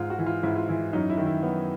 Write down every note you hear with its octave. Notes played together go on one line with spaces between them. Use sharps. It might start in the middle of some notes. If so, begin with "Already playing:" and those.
Already playing: G#2 F4
F#4
E3
F4
G#2 E4
F4
E3 E4
F#2 D#4
E4
D#3
E4
F#2 B3